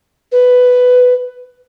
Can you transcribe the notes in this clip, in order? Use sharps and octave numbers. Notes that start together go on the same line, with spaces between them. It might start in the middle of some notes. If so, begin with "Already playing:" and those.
B4